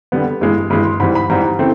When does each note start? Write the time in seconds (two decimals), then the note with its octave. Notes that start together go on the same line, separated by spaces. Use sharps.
0.12 D3 G3 B3
0.41 G2 E3 G#3
0.70 G2 E3 G#3 B5
0.85 C6
1.00 G#2 E3 G3 B5
1.15 B5
1.30 G#2 E3 G3 A#5
1.59 C#3 E3 A3 C4